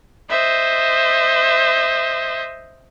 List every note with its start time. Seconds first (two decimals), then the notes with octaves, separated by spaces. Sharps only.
0.29 C5 D#5 E5